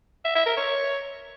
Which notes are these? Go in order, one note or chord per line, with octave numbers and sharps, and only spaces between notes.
E5
E5
A#4
C#5